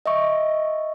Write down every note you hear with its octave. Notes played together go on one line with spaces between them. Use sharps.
D#5 E5 C#6